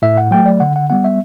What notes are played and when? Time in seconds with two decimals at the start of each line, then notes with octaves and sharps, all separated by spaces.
0.02 A2 E5
0.18 F#5
0.31 F#3 A3 G5
0.46 D5
0.60 D3 F#5
0.76 F#5
0.90 G3 B3 F#5
1.04 E5